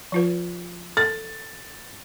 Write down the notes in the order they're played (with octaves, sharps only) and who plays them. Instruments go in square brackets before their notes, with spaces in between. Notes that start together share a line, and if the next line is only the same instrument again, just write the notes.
[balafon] F3 F4 B4
[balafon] A4 [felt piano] A6